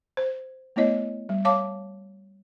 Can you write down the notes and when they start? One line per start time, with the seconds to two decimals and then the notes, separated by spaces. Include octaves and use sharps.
0.17 C5
0.76 A3 B3 E4 C#5 D#5
1.29 G3
1.45 C#5 F5 A5 D6